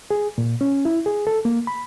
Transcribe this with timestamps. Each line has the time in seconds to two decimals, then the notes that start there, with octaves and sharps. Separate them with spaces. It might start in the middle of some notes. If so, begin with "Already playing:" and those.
0.11 G#4
0.38 A#2
0.61 C#4
0.85 E4
1.06 G#4
1.27 A4
1.45 A#3
1.67 B5